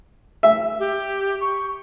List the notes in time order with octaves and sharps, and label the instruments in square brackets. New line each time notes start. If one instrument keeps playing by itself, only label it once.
[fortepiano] E5
[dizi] G4
C#6